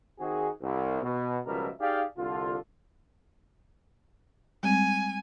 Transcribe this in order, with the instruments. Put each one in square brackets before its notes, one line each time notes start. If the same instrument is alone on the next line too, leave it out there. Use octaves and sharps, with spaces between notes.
[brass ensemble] D#3 C4 D#4 F#4 G#4
C2
B2
C#2 B2 F3 G3 A#4 E5
D#4 G4 G#4 D5 F5
C2 D3 F4
[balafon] G3 G#3 C4 [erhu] G#5